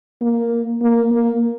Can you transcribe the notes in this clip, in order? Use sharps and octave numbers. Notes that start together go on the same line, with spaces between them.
A#3
A#3
A#3